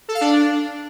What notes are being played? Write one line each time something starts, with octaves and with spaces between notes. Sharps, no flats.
A4
F5
D4